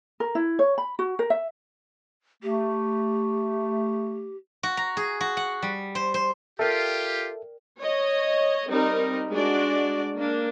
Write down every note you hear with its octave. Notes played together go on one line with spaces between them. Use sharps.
A#4
E4
C#5
B5
F#4
A#4
E5
A3 G4
F#4
A#5
G#4
F#4
F#5
G3
C5
C5
F4 G4 A4 A#4 D5 E5 G5
C#5 D#5
G3 C4 D#4 A#4
G#3 D4 F#4 D5
A#3 D4